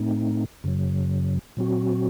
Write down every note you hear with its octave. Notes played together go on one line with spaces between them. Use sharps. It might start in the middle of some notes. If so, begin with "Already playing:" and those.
Already playing: A2 A3 C4 D#4
F#2 C#3 F#3
A#2 F#3 C4 F#4